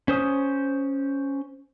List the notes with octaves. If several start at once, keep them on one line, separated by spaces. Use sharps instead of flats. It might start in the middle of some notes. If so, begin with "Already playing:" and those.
C#4 C5 D#6